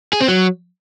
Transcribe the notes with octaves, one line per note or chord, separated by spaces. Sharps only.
G#4
C4
F#3